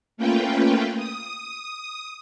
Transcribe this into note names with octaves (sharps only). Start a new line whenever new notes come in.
A3 A#3 C#4 F4 B4 G5
D#6